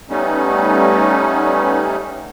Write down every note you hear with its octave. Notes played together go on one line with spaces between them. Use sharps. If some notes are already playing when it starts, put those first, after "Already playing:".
G3 A3 B3 C#4 D#4